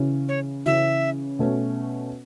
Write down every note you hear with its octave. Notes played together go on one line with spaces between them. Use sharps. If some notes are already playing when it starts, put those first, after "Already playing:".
Already playing: C#3 E3 C#4
C#5
C#3 E3 C#4 E5
B2 A3 C#4